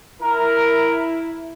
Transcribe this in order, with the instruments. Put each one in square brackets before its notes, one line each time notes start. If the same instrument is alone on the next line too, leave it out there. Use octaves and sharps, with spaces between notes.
[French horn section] E4 [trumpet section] A#4